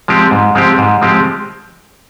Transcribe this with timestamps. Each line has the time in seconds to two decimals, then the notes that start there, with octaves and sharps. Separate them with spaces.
0.08 F3 G#3 C4 G4
0.31 G#2
0.55 F3 G#3 C4 G4
0.78 G#2
1.01 F3 G#3 C4 G4